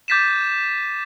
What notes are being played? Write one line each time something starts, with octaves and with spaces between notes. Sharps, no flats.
D6 G6 A6 B6 D#7 E7